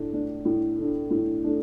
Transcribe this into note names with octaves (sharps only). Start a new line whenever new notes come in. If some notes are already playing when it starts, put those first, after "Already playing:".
Already playing: A2 A3 D4
A3 D4
A2
A3 D4
A2
A3 D4